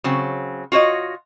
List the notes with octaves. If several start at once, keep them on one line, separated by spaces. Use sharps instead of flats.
C#3 F#3 C4
F4 F#4 C#5 D#5